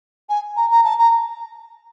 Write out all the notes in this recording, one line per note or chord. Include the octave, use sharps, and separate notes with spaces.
G#5
A#5
A#5
A5
A#5